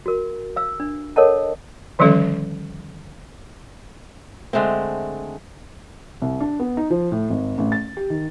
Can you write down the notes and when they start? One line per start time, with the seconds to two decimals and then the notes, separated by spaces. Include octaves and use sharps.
0.06 F#4 A#4
0.56 F5 E6
0.80 D4
1.16 A4 A#4 C#5 D#5 F#5 A5
1.99 D3 D#3 F3 G3 C#4 A4
4.53 D3 G#3 A3 C4
6.22 C2
6.40 D4
6.60 B3
6.77 D#4
6.90 F3
7.12 A2
7.30 G#1
7.58 A1
7.72 A6
7.97 G4
8.10 D#3